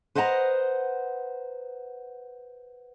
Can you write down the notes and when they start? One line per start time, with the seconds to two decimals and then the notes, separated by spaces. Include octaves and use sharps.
0.15 B4 C5 D#5 F#5 G#5 A#5